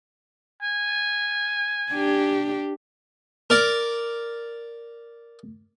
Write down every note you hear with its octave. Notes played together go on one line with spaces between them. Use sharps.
G#5
D4 G4
A#4 D5